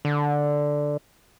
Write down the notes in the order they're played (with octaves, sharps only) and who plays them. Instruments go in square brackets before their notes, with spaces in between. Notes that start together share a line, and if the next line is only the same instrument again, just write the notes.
[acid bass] D3